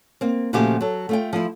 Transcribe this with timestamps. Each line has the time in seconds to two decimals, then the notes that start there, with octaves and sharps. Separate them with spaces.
0.21 A#3 C4
0.53 A#2 C#3 F3 A3 F#4 G4
0.81 F#3 A4
1.09 A3 F4 G5
1.33 F3 E4